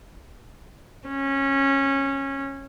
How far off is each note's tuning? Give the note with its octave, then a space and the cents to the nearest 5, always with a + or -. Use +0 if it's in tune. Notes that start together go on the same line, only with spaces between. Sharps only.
C#4 -15